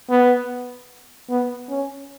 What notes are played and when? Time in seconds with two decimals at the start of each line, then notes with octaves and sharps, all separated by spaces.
0.10 B3
1.29 B3
1.69 C#4